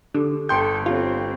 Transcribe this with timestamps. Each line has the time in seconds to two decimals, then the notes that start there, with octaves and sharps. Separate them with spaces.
0.14 D3 G4 A4 D6
0.49 G1 A4 G5 C6 D#6 G6 C#7 D7
0.86 C4 F4 G4 A4 C#5